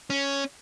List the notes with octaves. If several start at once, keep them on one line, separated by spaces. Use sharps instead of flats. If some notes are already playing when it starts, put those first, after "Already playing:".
C#4